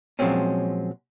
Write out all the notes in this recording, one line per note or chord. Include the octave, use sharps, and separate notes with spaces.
A#2 F3 F#3 G#3 C4 C#4